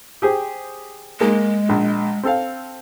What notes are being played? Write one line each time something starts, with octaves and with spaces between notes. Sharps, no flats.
G4 G#4 C5
G#3 A#3 G#4 A#4
A#1
C4 A4 F5